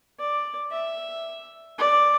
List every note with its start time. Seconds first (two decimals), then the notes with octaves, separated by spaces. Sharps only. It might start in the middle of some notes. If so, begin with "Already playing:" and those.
0.19 D5
0.71 E5
1.78 D5